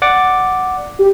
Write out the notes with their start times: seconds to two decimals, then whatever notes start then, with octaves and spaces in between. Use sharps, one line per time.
0.02 D5 F#5 D6
0.99 G4